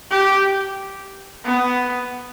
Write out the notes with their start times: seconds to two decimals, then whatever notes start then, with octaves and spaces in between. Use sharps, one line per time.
0.11 G4
1.45 B3